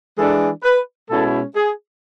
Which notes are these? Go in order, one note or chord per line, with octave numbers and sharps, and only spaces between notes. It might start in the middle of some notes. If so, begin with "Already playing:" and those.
E3 G#3 D4 A4
B4
B2 G#3 C#4 E4 A4
G#4